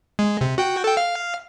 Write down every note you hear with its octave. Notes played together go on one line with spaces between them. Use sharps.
G#3
C3
F#4 G5
A4 G5
F5